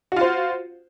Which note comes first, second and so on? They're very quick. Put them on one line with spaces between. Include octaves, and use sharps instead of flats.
F#4 F4 C5